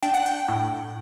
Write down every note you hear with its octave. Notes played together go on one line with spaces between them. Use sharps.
D4 G5
F#5
G5
A2